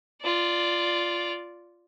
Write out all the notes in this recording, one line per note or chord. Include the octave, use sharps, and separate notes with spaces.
F4 D5